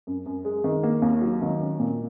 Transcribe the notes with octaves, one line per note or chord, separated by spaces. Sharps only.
F#2
F#2
G#3
D#3
A#3
D#2
F#3
D#3
C#4
A#2